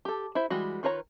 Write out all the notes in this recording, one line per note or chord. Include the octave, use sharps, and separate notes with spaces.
G4 A4
E4 C5 E5
E3 G3 G#3 F#4
D#3 F4 B4 C#5 A#5